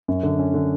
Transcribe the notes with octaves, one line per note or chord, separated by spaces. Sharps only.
F#2
D3
C#4
D3